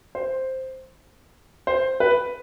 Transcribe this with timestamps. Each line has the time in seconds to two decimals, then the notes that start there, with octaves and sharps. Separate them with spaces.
0.15 C5
1.67 C5
2.00 B4